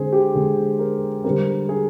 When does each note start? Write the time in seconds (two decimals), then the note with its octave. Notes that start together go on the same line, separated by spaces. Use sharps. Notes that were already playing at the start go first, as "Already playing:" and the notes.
Already playing: D3 G#3 C4 G#4 C5
0.12 G4
0.35 D3 G#3 C4 G#4
0.79 A#4
1.24 D3 G3 C4 A#4
1.69 G#4